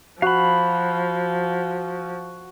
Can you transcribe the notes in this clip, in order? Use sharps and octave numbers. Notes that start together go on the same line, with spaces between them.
F3 F#4 F5 B5